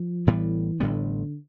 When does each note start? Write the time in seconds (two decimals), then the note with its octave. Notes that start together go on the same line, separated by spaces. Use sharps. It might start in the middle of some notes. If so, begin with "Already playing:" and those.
Already playing: F3
0.27 A1 A2 E3 G3 B3
0.80 A1 A2 D3 G3 B3